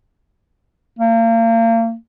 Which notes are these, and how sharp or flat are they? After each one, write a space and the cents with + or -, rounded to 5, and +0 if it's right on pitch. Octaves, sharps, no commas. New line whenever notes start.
A#3 -35